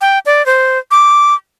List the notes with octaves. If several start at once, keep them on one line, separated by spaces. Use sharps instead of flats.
G5
D5
C5
D6